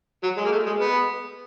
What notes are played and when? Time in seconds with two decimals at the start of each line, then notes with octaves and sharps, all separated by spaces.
0.23 F#3
0.37 G#3
0.45 A#3
0.52 A3
0.66 G#3
0.80 B3